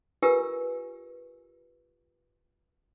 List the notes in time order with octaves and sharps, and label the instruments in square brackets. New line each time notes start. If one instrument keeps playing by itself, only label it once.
[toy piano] F4 G4 A#4 B4 G#5 E6